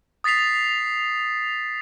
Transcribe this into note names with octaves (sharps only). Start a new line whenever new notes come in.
D#6 A6 B6 C7 F7